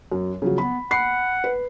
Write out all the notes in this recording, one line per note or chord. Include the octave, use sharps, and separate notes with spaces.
F#2
C#3 F3 F#3
B3 B5
F#5 B5 C7
B4